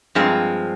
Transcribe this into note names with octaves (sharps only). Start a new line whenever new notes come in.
G2 F3 G#3 C4 F4